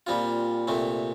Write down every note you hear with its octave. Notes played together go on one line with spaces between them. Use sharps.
A#2 G3 C4 F4
C2 A#2 A3 C4